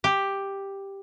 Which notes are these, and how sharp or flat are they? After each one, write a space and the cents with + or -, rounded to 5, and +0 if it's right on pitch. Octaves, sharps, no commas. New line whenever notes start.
G4 +5